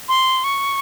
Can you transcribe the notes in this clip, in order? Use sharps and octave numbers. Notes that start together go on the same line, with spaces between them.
C6
C#6